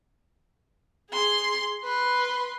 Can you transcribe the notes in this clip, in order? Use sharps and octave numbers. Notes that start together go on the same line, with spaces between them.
G#4 C6
B4 C6